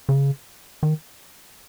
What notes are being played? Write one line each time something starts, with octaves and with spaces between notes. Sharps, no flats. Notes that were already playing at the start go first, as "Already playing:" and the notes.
C#3
D#3